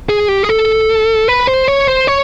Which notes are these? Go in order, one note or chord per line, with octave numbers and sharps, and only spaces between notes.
G#4
G4
G#4
A4
B4
C5
C#5
C5
C#5